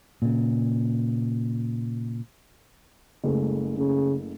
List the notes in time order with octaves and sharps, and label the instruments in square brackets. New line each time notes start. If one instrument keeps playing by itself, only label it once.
[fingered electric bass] A#2 C#3
[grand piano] F#1 G#3 A3
[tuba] C#3